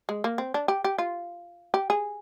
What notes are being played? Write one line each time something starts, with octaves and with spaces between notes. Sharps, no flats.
G#3
A#3
C4
D4
G4
G4
F4
G4
G#4